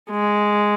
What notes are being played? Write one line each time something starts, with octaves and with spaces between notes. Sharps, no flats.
G#3